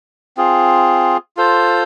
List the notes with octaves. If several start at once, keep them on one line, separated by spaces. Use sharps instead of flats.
C4 F4 G#4
F4 A4 C5